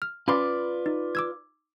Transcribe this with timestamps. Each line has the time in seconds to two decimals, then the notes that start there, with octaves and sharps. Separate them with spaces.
0.02 F6
0.28 C#4 F4 B4 D5 B5 C6
0.86 D#4
1.15 D6 E6 G#6